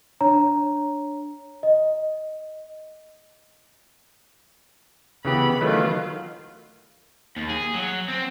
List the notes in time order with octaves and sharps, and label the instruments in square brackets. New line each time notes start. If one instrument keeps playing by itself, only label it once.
[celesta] D4 C#5 A#5
D#5
[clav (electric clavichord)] C#3 E3 G4 [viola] B3 B5
[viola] D#3 F4 [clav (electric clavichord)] E3 F#3 A3
[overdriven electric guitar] D#2
G#4
F#3
C4